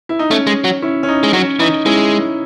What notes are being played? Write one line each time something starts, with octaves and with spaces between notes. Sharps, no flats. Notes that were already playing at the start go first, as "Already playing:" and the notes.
E4
D#4
A3 C#4
G#3
F#3
C#4 E4
C#4
D#4
G#3
F#3 C#4
E3 D#4
G#3 C#4 E4